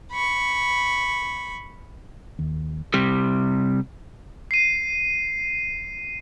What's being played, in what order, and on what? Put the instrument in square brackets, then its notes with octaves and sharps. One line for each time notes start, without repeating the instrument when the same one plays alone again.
[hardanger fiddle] B5 C#6
[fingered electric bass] D#2
[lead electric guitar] C3 G3
[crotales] C7 D#7